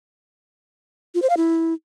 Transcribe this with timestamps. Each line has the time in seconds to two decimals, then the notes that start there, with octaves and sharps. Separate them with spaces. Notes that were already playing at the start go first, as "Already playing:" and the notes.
1.15 F4
1.22 C5
1.30 F5
1.37 E4